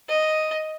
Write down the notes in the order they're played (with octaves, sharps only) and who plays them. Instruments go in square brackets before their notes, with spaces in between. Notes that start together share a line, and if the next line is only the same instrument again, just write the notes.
[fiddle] D#5